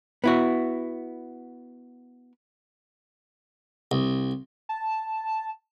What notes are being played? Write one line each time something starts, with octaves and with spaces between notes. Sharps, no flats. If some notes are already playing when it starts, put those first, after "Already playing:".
B3 E4 F#4
C2
A5